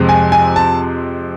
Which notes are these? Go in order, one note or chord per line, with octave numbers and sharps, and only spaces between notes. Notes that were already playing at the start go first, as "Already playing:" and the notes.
Already playing: F2 C3 G#3 C4
G#5
G#5
A5